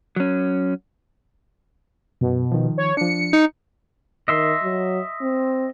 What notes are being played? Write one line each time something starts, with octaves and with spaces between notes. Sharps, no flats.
F#3 C#4
F#2 B2
D#3 F3
C#5
F3 D4 C#7
D#4
D#3 D#5 E5 C6
F#3
C4